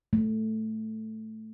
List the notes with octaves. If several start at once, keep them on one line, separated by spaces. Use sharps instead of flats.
A3